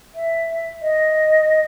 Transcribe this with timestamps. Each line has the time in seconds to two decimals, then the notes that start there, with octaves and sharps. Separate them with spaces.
0.15 E5
0.82 D#5